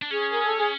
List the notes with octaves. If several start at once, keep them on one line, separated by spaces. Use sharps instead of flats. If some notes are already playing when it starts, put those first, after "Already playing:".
D4
C#4 G#4
A#4
A4
G#4